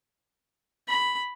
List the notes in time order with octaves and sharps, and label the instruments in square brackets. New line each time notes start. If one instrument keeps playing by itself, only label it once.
[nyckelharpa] B5